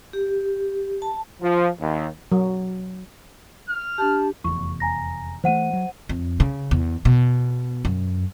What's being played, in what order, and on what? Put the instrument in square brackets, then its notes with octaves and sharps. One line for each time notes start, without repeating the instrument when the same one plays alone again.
[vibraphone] G4
A5
[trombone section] F3
D#2
[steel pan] F#3
[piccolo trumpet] F6
[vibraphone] D4 G4 [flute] A5
[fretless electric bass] F1 E2 [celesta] C#6
[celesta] G#5 A#5 A#6
[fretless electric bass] E3 F#3 A3 [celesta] C5 F#5 D#7
[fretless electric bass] F#3
[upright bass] F2
C#3
E2
B2
F#2